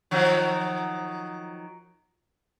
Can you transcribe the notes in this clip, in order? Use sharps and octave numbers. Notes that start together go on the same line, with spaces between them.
D#3 F3 F#3